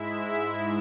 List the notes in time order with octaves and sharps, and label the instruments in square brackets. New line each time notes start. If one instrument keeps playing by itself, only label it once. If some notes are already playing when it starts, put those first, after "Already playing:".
Already playing: [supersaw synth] G#2 G#3 E4 E5